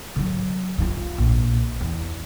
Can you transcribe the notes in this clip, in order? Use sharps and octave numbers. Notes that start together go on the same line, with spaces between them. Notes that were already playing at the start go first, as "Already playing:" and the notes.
D3 F#3
G2 F4
A#1
E2